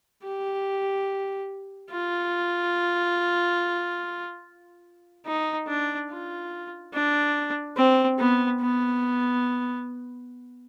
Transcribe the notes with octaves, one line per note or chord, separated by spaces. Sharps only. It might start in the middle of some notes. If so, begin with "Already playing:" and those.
G4
F4
D#4
D4
F4
D4
C4
B3
B3